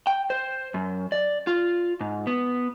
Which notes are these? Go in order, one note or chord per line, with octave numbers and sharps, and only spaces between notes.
G5
C5
F#2
D5
F4
G#2
B3